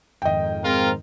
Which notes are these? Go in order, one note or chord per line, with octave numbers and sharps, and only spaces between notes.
F2 G#2 D#3 D#5 G5
G#3 C4 F4 A#4